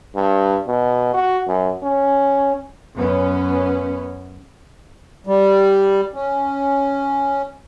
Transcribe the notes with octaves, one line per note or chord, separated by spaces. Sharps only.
G2
B2
F#4
F#2
C#4
F#2 B3 C#4
G3
C#4